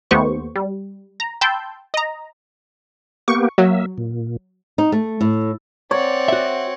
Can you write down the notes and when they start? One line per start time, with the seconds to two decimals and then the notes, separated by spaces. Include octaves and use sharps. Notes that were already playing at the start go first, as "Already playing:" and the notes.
0.11 D#2 A3 B3 G4 C5 C#6
0.56 G3
1.20 A#5
1.41 G5 A5 B5 C6 E6 G6
1.94 D#5 A#5
3.28 A#3 B3 G4 C#6
3.58 F#3 A#3 E5
3.98 A#2
4.78 D#4
4.92 A3
5.21 A2
5.91 C4 C#5 D5 F#5
6.28 F#4 E5